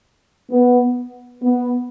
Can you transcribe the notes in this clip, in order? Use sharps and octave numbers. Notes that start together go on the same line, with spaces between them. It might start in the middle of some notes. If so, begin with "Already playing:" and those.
B3
B3